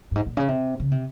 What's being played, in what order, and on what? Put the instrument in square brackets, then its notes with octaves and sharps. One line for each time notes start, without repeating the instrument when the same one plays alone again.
[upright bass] G2
G#2
A#2
C#3
C3
C#3
C3